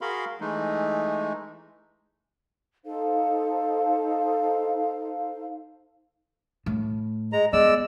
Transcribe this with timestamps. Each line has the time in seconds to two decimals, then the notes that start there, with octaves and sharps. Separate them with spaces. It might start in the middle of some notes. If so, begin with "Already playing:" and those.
0.01 F#4 G#4 A#4 F5 B5 C6
0.41 E3 G#3 A3 D#4
2.84 D#4 A4 C5 F5
6.66 A2
7.33 G#3 A#5
7.53 G#3 B3 D5 E6